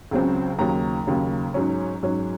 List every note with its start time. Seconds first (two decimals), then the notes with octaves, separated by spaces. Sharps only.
0.11 C#2 C#3 F#3 C4
0.59 D#2 C#3 F#3 A#5
1.07 D#2 C#3 F#3
1.54 G#2 F#3 C#4
2.03 G#2 F#3 C#4